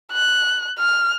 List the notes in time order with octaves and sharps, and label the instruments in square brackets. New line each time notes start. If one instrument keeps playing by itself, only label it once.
[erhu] F#6
F6